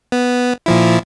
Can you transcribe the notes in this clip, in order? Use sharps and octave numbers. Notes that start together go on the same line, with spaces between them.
B3
A#2 F3 E4